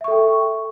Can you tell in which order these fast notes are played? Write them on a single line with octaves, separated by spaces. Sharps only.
E5 C#6 A4 G5